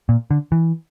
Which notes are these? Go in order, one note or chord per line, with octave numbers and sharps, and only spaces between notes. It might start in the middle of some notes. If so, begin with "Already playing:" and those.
A#2
D3
E3